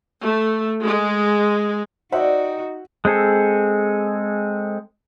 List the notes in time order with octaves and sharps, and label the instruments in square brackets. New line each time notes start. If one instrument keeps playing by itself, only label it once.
[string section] A3
G#3
[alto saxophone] D#4 [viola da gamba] F#4 [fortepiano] C5 E5 F#5 [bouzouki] D5 G5
[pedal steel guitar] G#3 C4 G#4 A4